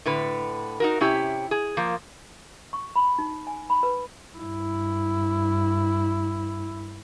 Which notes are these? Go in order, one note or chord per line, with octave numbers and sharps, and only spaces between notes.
A2 D3 B4
D#4 F#4 A#4
C3 C#4 E4 G4
G#4
F3 A#3
C#6
B5
D#4
G#5
B5
B4
G2 E4